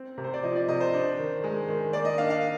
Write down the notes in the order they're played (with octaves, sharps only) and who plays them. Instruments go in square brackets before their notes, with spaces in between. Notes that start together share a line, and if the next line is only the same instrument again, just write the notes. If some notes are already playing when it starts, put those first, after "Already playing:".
Already playing: [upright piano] C4
C3
C5
D5
F3 D#5
D5
C3 D#5
C5
D4
D#3
G#3
D#3
A#3 D5
D#5
D4 F5
F5